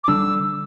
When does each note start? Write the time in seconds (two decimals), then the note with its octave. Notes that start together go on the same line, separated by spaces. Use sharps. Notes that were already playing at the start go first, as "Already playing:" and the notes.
0.03 D6
0.08 D3 G3 D4 E6